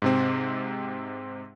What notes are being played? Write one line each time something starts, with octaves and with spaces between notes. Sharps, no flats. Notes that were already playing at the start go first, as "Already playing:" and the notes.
G#2 C3 C4